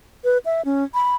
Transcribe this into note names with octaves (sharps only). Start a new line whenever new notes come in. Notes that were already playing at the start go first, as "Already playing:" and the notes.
B4
E5
C#4
B5